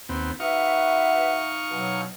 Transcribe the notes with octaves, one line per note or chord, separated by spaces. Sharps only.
D#2 B3 C4
D#4 F#4 B4 E5 F5 C#6
B2 F#3